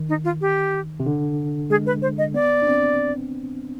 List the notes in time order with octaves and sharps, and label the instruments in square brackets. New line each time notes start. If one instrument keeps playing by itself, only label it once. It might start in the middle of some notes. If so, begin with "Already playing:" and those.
Already playing: [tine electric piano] D#3
[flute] D#4
F4
G4
[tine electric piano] C3
D3
[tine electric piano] G#3 [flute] G#4
[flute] B4
C5
D#5
[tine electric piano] B3 [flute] D5
[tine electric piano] D4
C4